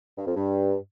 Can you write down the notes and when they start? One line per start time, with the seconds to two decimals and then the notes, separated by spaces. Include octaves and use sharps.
0.17 G2
0.27 F2
0.36 G2